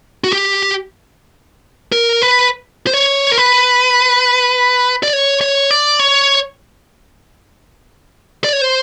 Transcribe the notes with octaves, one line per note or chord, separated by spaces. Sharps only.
F#4
G4
A#4
B4
C5
C#5
A#4
B4
D5
C#5
C#5
D5
C#5
D5
C#5
C5